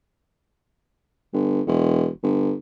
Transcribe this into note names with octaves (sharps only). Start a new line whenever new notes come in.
G1
E1
G1